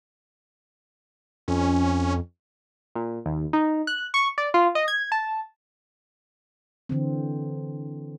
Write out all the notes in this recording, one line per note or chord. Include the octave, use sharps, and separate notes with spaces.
F2 C#4
A#2
D#2
D#4
F#6
C#6
D5
F4
D#5
G#6
A5
D3 E3 C4